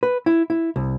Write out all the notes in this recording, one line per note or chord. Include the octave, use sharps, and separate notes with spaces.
B4
E4
E4
C2